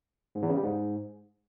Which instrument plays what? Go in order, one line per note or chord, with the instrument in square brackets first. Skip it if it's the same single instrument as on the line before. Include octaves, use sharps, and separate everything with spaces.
[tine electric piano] G#2
E2
C#3
G3
G#2